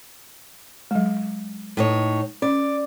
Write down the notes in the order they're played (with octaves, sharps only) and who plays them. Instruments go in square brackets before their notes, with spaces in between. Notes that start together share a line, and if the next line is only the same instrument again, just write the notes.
[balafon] F#3 G#3
[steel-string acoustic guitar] A2 D#4 C#5
[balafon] C#4 [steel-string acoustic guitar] D5